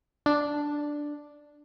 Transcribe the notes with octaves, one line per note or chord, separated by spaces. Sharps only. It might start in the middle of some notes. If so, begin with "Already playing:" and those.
D4